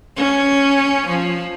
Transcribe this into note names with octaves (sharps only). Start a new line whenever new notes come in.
C#4
F3